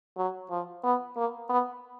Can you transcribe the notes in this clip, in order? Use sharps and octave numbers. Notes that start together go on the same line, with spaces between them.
F#3
F3
B3
A#3
B3